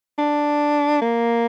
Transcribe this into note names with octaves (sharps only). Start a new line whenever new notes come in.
D4
A#3